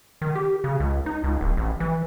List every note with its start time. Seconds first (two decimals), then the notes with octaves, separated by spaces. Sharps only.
0.22 D#3
0.36 G4
0.64 C#3
0.80 C#2
1.06 D#4
1.24 C#2
1.41 D1
1.57 A1
1.80 E3